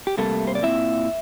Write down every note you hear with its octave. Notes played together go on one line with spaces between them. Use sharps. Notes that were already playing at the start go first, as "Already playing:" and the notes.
G4
C3 G3 A3 A#3 A4
C5
D5
A#2 G3 C4 E4 E5